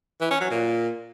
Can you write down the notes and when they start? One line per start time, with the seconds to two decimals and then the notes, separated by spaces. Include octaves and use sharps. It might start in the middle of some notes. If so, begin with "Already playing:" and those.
0.21 E3
0.31 C#4
0.40 F#3
0.50 A#2